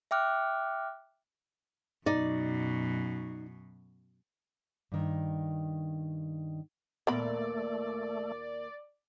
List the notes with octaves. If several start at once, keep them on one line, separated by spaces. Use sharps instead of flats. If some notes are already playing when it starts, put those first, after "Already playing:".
E5 G5 D6 F6 F#6
F#2 B2 D#4 D5
G2 D#3
D#2 A#2 A3 B3 A#4 D5 B5